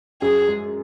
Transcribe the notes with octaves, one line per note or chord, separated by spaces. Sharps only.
F#2 G#4
G#3